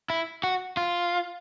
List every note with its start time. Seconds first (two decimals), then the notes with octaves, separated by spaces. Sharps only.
0.10 E4
0.43 F#4
0.77 F4